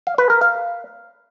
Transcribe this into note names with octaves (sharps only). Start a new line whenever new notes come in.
F5
B4
A#4
F5